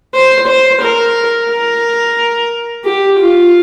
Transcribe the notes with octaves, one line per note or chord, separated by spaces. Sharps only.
C5
C5
A#4
A#4
G4
F4